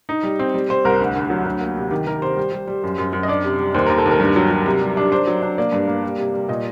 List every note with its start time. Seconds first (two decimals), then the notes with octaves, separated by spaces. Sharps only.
0.09 D#4
0.23 G3
0.39 C4
0.54 G3
0.69 G3 C5
0.85 C2 A#4
1.00 D2
1.16 D2
1.30 F#3
1.45 D2
1.60 A#3
1.77 C3
1.91 D#3 G4
2.07 D#3 A#4
2.22 C3 C5
2.37 G3
2.52 G3
2.67 G3
2.84 F#2
2.98 F#2
3.13 F#2
3.23 D#5
3.28 D4 D5
3.43 C3
3.60 G3
3.74 D#2 C5
3.86 D#2 A#4
3.98 A4
4.06 D#2
4.11 A#4
4.20 G2
4.36 F#3
4.51 F#3
4.66 C3
4.82 G3
4.97 D4
5.12 D4 C5
5.27 F#3
5.42 D4
5.58 A#3 D5
5.72 G2
5.88 A#3
6.03 G3
6.18 C3
6.34 G3
6.48 A#2 D#5